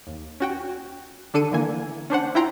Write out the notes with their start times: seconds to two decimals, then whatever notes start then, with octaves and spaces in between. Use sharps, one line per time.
0.07 D#2
0.40 C#4 F#4 G5
1.34 D3 D4 A4 C#7 D#7
1.51 D3 E3 A#3 G#5
2.10 C#4 D4 C5 F#5
2.35 E4 F4 G5 A#5 C6